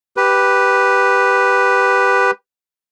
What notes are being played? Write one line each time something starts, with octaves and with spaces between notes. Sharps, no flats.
G4 B4